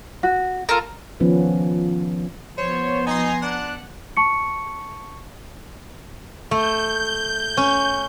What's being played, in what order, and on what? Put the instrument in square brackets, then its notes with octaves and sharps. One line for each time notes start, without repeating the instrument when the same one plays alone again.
[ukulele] F#4
[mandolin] F4 A4 A#4
[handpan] D#3 F3 B3 C#4 F4 B4
[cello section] F3 B3 [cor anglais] C5 [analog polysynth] C#5
[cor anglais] D#4 [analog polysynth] G#5 A#5 C6
[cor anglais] D4 [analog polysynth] F#5
[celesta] A5 C#6 C#7
[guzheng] A3 [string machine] G6
[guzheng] C#4